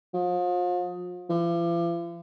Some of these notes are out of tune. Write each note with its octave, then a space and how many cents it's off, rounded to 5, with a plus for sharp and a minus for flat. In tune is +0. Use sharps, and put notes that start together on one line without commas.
F3 +40
F3 -45